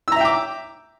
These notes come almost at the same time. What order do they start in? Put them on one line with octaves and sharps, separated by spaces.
E6 A#5 E5 G5 D6